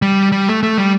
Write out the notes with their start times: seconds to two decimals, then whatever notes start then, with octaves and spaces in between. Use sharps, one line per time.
0.02 G3
0.32 G3
0.48 A3
0.63 A3
0.78 G3